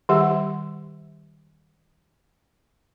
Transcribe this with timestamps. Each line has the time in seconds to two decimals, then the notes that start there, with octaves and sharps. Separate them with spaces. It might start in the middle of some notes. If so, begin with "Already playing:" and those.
0.09 D#3 G3 G4 F#5